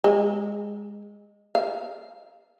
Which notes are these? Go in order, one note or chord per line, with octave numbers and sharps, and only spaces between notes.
G#3
F5